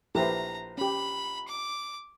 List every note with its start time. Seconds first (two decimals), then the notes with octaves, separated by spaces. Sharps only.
0.15 A#1 E4 G4 A4 B4 C5 A#5
0.78 C#4 G4 B5
1.48 D6